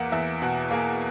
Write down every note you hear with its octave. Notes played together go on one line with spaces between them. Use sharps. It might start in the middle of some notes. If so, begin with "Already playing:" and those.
Already playing: E2 A#3 F#5
E2 E5
B2 F#5
A#3 G#4